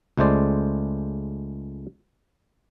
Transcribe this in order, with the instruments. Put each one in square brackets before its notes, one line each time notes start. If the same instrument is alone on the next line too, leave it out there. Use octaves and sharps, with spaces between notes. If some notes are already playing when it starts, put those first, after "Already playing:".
[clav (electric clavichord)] C#2 G#3 A3 C5 D5